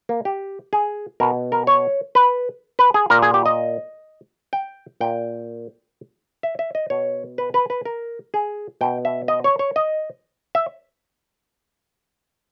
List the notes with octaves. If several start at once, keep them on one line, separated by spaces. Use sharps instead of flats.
A#3
G4
G#4
B2 A#4
A#4
C#5
B4
B4
G#4
A#2 A#4
G#4
G4
D#5
G5
A#2 G5
E5
E5
D#5
B2 C#5
B4
B4
B4
A#4
G#4
B2 G5
E5
D#5
C#5
C#5
D#5
E5